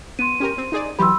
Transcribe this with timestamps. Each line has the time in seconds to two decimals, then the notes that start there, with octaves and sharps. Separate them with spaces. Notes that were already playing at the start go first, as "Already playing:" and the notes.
0.19 B3 C6 D#7
0.40 C#4 G4 A#4
0.58 C4
0.72 D#4 G#4 D5
0.99 E3 F#3 G4 B5 C6 E6